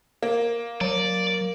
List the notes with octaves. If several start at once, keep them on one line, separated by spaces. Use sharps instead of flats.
A#3
F#3 D5